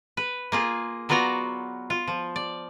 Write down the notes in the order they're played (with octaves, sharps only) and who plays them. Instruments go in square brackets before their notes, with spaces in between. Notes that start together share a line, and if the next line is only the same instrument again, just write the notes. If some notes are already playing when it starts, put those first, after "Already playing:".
[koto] B4
A#3 F4 G#4
F#3 B3 F4 F#4 D5 A#5
F4
F3
D5